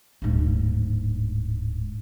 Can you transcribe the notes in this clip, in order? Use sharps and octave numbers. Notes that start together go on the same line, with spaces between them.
D1 G#2